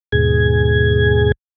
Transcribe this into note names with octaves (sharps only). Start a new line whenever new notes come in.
D#2 G#2 B2 G#4 G#6